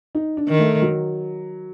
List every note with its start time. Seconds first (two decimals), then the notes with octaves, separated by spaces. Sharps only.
0.15 D#4
0.37 D4
0.49 D#3
0.59 A3
0.82 F#3